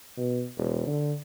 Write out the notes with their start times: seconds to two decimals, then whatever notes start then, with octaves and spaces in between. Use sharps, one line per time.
0.17 B2
0.57 E1
0.87 D3